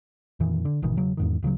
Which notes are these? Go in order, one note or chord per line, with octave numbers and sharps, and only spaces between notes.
F2 A#2 D#3 E3
D3
G#1 B2 D#3 E3
E1 C#3 F#3
E2 G#2 D#3
D1 C#3 E3 F#3